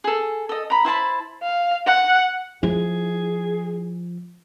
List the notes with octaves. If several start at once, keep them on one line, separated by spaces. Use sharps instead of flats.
G#4 A4
A4 D#5
A#5 B5
E4 C5 A5 B5
F5
F#5
F3 E4 G#4